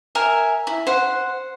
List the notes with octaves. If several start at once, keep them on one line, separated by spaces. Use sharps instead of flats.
A#4 E5 G#5
E4
C5 F#5